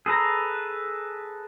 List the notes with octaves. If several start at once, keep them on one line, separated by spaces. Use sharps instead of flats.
G#4 A4 B4 A#5